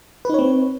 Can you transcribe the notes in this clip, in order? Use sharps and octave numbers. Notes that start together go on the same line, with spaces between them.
C4 D#4 B4 C#5